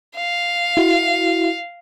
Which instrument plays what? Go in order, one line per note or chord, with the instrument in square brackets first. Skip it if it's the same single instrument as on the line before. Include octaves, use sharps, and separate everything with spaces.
[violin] F5
[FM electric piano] E4 F#4